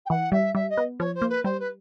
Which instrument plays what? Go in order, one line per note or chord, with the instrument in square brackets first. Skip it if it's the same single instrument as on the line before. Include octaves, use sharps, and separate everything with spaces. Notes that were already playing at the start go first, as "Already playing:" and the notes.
[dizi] G5
[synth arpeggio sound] E3 [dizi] F#5
[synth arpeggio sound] G3 [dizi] E5
[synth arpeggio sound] G3 [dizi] E5
[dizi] D#5
[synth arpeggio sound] B3
[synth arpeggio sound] F3 [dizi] C#5
[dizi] C5
[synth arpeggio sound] A#3
[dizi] B4
[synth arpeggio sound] G3 [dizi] C5
[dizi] B4